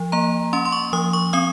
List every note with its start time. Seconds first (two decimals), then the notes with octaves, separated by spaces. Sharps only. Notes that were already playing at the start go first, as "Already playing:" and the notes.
Already playing: F3
0.12 A#3 A#5
0.53 C#4 C6
0.65 C6
0.72 C#6
0.93 F3 D#6
1.13 C#6
1.33 C4 D#6